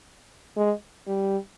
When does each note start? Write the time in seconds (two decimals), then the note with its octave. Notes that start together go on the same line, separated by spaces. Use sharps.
0.56 G#3
1.07 G3